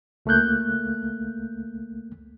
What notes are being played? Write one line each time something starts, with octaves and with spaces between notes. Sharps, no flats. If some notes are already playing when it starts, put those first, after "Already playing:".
C#2 A3 A#3 F#6 G6